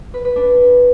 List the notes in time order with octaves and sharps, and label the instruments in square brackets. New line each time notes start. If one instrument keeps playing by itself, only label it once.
[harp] B4
B4
D4